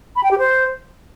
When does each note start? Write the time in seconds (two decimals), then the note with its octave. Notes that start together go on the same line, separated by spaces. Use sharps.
0.16 B5
0.23 G5
0.31 G4
0.39 C5